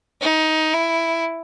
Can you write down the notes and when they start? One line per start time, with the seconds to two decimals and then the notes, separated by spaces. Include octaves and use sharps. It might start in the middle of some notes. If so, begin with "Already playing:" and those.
0.21 D#4
0.73 E4